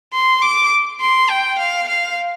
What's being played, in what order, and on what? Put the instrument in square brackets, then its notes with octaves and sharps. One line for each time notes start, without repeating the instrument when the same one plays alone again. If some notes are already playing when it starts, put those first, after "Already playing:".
[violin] C6
D6
C6
G5
F5
F5